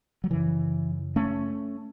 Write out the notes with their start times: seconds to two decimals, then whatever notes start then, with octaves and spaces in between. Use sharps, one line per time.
0.24 F#3
0.30 F#2 C#3 E3
1.16 A3 C#4